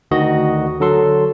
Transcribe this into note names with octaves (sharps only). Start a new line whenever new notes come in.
D2 D#3 F#4 D#5
D3 F#3 A4 C6